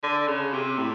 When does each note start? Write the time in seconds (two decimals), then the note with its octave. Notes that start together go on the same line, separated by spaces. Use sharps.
0.03 D3
0.28 C#3
0.53 C3
0.78 A2